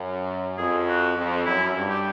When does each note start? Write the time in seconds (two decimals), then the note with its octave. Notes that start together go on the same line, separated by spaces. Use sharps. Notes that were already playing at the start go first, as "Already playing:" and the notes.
Already playing: F#2
0.57 F2 G#4
0.87 F#4
1.16 F2
1.45 F#2 E4
1.75 G2
1.89 G4